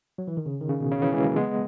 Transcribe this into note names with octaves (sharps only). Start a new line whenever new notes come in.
F#3
E3
D#3
C#3
D#3
C#3
B2
C#3
C#3 E3
E3 G#3
F#3 A#3
G#3 B3